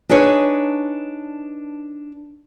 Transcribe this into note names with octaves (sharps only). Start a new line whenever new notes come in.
D4 D#4 G#4 B4 C#5